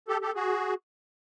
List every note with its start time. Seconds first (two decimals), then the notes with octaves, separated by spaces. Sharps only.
0.08 G4 A4
0.21 G4 A4
0.35 F#4 G#4